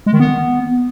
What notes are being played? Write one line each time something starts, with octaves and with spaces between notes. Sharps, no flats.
G#3
D#3
B3